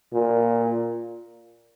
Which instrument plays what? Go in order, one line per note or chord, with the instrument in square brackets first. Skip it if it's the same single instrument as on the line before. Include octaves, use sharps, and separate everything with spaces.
[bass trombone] A#2